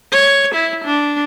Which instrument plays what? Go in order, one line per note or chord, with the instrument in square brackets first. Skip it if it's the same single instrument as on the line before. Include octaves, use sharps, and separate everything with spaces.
[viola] C#5
E4
D4